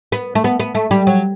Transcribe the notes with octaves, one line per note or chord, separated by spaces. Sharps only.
B3
A3
B3
B3
A3
G3
F#3